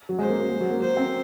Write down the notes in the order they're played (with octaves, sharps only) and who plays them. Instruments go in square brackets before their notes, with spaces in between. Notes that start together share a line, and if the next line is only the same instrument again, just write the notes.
[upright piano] F#3
[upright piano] G#3 [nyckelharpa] C5
[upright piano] A#3
A#3
G#3
F#3
A#3
[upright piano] F#3 [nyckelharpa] C5
[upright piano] C4